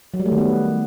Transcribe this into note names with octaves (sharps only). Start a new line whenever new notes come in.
F#3
G3
A3
D#3
B3